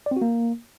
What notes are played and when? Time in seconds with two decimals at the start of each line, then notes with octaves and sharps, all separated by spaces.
0.06 D5
0.11 C4
0.16 F#4
0.22 A#3